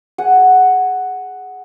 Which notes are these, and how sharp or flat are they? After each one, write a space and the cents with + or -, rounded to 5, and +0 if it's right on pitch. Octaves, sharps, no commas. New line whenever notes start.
G#4 +0 F#5 +0